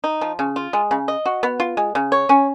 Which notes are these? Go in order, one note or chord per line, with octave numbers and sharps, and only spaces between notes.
D#4
F3
C#3
F4
G#3
C#3
D#5
F#4
B3
F4
G#3
C#3
C#5
C#4